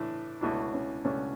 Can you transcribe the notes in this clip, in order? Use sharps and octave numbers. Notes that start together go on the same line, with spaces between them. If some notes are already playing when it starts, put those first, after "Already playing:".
Already playing: A2 E3 A3 D4 E4
C#2 B2 A3 D4 E4
C#4
C#2 B2 A3 C#4 D4